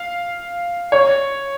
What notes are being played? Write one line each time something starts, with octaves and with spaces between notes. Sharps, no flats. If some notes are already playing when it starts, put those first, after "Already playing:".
Already playing: F5
C#5